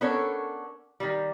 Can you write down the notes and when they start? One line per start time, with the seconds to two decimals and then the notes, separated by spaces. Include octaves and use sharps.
0.01 B3 C#4 D4 A4 A#4 C#5
1.00 D#3 G3